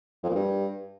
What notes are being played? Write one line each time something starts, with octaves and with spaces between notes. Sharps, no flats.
F2
A#2
G2